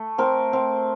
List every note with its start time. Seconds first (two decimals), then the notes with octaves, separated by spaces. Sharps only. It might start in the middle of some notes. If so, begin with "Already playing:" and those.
Already playing: A3
0.18 C4 A#4
0.53 C4